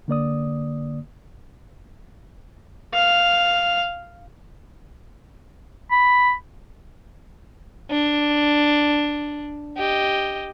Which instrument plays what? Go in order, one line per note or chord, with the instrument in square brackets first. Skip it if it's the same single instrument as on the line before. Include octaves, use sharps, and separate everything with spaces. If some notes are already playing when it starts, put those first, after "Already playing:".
[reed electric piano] D3 A#3 D5 D#6
[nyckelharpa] F5
[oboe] B5
[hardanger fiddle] D4
G4 D#5